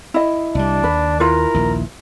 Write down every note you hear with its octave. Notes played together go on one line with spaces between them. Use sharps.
E4 D#5
C2 G3 D4
D#2 B4
E4 F4 A#4 B4
A#1 D#2